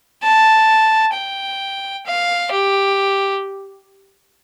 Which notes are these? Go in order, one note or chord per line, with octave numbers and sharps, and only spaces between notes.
A5
G5
F5
G4